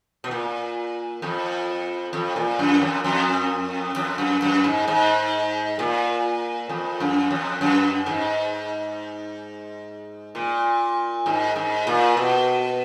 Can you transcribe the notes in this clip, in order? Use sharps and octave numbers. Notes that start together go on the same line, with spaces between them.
B2
A#2
F2
F2
A#2
F#2
F2
F2
F2
F#2
F#2
G#2
G#2
A#2
F2
F#2
F2
F#2
G#2
A#2
G#2
G#2
A#2
B2